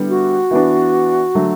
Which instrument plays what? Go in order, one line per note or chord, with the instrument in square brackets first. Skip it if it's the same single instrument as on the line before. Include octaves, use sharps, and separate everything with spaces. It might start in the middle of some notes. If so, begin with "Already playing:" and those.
Already playing: [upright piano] D3 G3 B3 E4
[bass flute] F#4
[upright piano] E3 B3 D4
D3 F#3 A3